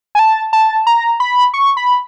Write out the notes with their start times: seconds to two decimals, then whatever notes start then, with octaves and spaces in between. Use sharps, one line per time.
0.15 G#5
0.19 A5
0.53 A5
0.87 A#5
1.20 B5
1.54 C#6
1.77 B5